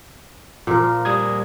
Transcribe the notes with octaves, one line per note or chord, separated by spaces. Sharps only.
A#2 F3 A#4
G3 D#6 G#6